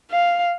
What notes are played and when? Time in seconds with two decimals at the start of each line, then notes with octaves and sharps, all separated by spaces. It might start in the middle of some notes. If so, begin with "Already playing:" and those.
0.11 F5